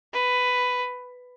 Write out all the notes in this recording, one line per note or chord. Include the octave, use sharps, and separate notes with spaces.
B4